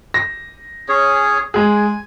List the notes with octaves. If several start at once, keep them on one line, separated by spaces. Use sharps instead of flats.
A#6
C#4 G#4 C#5
G#3 G#4 G#5